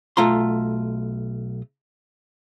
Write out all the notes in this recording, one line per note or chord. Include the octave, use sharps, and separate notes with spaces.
B1 A3 F4 A#5 C6